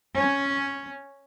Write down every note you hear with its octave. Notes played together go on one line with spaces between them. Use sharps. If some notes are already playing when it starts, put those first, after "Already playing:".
C#4